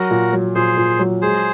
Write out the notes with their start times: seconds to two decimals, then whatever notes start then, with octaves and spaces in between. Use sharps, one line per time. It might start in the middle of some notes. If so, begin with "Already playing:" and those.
Already playing: F#3 F#4 A#4
0.11 A#2
0.33 F#3
0.55 A#2 G#4 C5
0.77 A#2
0.99 F#3
1.22 G#3 G#4 C5